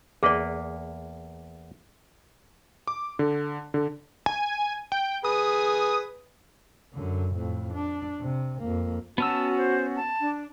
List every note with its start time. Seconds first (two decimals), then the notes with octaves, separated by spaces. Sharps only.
0.23 E2 A#3 G#4 B4 D5
2.87 D6
3.19 D3
3.74 D3
4.26 G#5
4.92 G5
5.25 G#4 B4 D#6
6.94 F#2 D3
7.35 F2 A2
7.74 D4
8.20 C3
8.59 F2 A#3
9.18 B3 C#4 F#4 A5 E6
9.57 C5
9.96 A5
10.20 D4